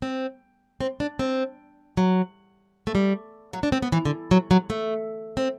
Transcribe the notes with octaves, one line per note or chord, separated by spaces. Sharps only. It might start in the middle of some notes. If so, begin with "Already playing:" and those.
C4
C4
D4
C4
F#3
A3
G3
F#3
D4
C4
B3
E3
D3
F#3
F#3
A3
C4